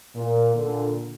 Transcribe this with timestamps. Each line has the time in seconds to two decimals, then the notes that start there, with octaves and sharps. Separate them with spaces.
0.15 A#2
0.55 A#2 D3